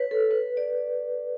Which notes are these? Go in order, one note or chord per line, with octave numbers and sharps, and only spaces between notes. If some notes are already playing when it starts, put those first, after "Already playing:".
Already playing: B4 C#5
A4
B4
D5